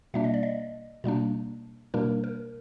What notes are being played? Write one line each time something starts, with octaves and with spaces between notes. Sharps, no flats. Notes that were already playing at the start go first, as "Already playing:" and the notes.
B2 G3 A#3 D4 E5
D#5
D5
D#5
B2 G3 A#3 D4
B2 G3 A#3 D4 A#4
A#4